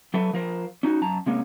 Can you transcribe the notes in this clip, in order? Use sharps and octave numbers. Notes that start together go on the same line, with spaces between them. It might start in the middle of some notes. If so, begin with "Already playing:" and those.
F#3 A4 B4 E5
F3 A#4 C5
C#4 D#4 E4 F#4
F#2 A5 A#5
C3 G#3 A#3 C#4